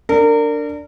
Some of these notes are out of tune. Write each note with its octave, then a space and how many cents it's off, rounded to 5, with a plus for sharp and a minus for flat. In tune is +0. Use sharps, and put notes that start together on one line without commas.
D4 +0 A#4 -30